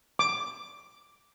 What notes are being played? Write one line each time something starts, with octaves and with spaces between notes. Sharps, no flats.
D6